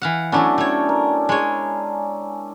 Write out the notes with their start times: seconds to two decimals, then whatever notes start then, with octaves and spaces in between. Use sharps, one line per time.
0.02 E3 F5 F#5
0.32 F#3 A3 B3 C#4 D4 E4
0.58 A3 C#5 G5
0.89 A#4
1.29 G#3 C#5